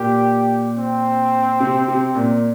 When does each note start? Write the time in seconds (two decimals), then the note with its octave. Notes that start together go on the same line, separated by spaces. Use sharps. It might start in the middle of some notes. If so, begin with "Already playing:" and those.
Already playing: A#2 G4
0.77 C4
1.60 C3
1.88 C3
2.15 A#2